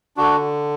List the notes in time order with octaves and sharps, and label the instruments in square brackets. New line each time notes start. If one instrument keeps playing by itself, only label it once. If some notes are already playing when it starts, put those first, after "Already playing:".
[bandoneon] D3 D4 F#4